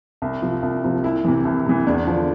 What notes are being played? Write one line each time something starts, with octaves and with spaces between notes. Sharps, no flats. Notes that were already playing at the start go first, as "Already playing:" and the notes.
C2
C3 F3
C2
C3 F3
C2 E4
C3 E3
C2
C3 E3
E2 D4
D3 F3